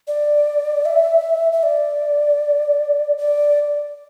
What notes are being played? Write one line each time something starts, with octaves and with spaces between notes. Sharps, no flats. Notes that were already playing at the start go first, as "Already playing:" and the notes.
D5
E5
E5
D5
D5